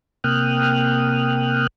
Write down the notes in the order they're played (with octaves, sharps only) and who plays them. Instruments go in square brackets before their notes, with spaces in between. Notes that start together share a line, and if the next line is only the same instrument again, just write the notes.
[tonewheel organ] C3 A#3 G5 D#6 F6 F#6